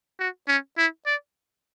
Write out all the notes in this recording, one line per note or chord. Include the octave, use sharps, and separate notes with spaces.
F#4
C#4
E4
D5